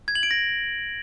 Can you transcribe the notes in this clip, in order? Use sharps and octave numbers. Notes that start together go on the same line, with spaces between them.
G#6
F#7
D7
A#6